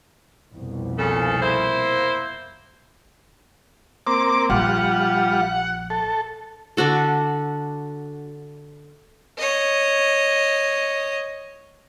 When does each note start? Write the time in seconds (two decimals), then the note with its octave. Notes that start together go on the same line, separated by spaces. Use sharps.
0.53 C2 F2 B2
0.97 A#2 C#3 A4
1.41 A#3 E4 C5
4.07 A#3 C4 D6
4.50 A#1 G3 F4 F#5
5.90 A4
6.77 D3 D4 F#4 A4
9.38 C#5 D#5